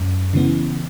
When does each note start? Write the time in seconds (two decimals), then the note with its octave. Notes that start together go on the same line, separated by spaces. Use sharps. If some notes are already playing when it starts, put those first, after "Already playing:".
Already playing: F#2
0.33 C#3 E3 B3